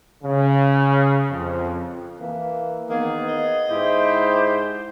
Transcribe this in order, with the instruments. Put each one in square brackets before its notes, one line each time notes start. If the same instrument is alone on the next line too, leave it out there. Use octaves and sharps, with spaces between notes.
[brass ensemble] C#3
F2
[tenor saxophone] E3 [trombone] A#3
[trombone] D#3 [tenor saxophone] A#3 [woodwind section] B3 G#4
[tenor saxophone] D#5
[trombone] G#2 [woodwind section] E4 G4 [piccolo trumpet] C5